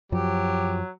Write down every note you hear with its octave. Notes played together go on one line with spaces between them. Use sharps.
F#2 F3 F#3 G4